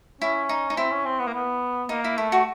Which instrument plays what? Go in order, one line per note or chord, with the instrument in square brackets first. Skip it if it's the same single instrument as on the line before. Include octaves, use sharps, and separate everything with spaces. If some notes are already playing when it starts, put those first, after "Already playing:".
[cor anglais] C#4 [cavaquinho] E4
[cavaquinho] D#4
D#4
[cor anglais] C4 [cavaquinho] E4
[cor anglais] C#4
C4
B3
A#3
B3
[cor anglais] A#3 [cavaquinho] D#4
[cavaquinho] E4
[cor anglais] A3 [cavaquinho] E4
[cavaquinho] F#4